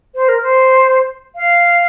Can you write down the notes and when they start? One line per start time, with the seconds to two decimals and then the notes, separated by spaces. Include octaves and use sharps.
0.15 C5
0.29 A#4
0.42 C5
1.36 F5